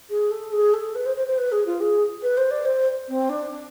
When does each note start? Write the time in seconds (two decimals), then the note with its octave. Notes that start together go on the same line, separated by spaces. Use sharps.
0.10 G#4
0.31 A4
0.52 G#4
0.73 A4
0.95 B4
1.06 C5
1.16 C5
1.27 C5
1.38 B4
1.52 G#4
1.66 F4
1.80 G#4
2.23 B4
2.37 C5
2.51 D5
2.65 C5
3.08 C4
3.29 D4
3.51 D4